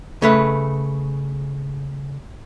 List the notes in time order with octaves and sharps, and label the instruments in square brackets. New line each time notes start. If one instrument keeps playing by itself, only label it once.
[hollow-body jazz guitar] C#3 A3 B4